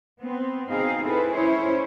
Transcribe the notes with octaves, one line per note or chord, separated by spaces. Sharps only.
B3 C4
B2 C4 D#4 G#4 F5
C4 E4 G#4 A4 B4
C#4 E4 C5 C#5